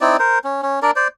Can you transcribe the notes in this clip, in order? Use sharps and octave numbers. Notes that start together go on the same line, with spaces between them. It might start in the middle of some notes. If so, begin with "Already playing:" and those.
C4 D#4 E4 D5
A#4 C5
C#4
C#4
D4 A#4 D5
C5 D5